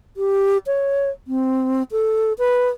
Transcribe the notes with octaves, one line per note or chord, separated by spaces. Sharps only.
G4
C#5
C4
A4
B4